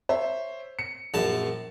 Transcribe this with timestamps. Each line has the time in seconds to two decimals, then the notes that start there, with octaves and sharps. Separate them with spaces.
0.09 C5 C#5 E5
0.79 C#7
1.14 A#1 F#2 A5 E7